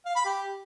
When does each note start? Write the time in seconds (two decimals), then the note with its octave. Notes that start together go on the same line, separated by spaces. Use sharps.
0.06 F5
0.16 B5
0.26 G4